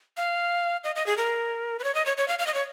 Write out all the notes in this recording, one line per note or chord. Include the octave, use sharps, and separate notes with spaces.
F5
D#5
D#5
G#4
A#4
B4
C#5
D#5
C#5
C#5
F5
F5
D#5
C#5